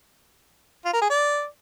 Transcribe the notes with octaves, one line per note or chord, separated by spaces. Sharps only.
F4
A#4
G#4
D5